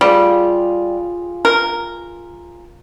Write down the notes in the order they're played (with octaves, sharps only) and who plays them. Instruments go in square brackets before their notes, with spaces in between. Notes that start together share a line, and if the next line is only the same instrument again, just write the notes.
[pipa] G3 [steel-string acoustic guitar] F4 G4 G#4
[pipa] A#4